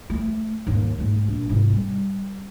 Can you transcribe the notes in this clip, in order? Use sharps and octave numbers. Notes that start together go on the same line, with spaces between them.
A3
D#2 G#2
G#2 A3
A#1
G#2 C3
G3